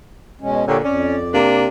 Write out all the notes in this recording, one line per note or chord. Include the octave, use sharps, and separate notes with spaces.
B2 G#3 C#4
A#2 D3 G4 A4 C#5
F2 C#4 D5
C3 A#3 D4